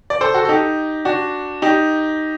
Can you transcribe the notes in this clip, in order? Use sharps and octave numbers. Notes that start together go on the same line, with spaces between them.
D5
A4 C5
F#4 A4
A4
D#4 G4
D4 F#4
D#4 G4